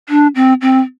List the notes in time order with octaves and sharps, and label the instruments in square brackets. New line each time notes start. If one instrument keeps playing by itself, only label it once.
[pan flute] D4
C4
C4